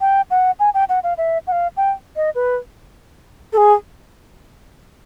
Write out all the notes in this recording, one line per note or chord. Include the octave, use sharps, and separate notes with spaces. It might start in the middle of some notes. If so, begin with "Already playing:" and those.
G5
F#5
G#5
G5
F#5
F5
E5
F#5
F5
G5
D#5
B4
A4
G#4